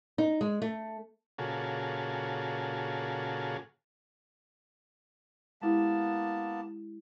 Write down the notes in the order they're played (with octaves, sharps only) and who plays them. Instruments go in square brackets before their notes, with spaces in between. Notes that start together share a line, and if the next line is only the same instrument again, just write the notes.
[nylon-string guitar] D#4
G#3
A3
[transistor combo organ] A#2 C#3 F4 F#4 G#4 A4
[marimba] G#3 E4 G4 [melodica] A#3 B3 A5